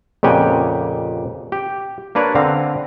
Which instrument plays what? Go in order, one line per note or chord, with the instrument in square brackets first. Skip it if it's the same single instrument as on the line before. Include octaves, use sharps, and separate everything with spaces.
[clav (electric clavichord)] F2 A#2 C#3 G4 F#5 G#5
G4
A#3 D4 B4 C#5 D5
D3 C4 F5 A#5